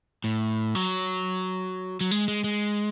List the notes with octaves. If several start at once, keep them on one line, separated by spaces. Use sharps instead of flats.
A2
F#3
F#3
G#3
G#3
G#3